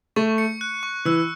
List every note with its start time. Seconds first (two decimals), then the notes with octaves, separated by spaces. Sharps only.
0.16 A3 C#6
0.38 C#7
0.61 F#6
0.83 C#6
1.05 E3 E6